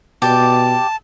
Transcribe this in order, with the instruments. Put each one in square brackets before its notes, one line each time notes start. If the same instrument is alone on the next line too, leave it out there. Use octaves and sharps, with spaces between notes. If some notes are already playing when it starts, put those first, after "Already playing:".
[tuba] B2 [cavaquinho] G4 D5 [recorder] A5